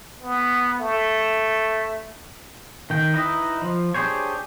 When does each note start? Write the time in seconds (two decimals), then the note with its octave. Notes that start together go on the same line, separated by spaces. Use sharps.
0.22 B3
0.80 A3
2.90 D#3 G5
3.14 D#4 E4 B4 D#5
3.61 F3
3.94 D4 G4 G#4 C5 C#5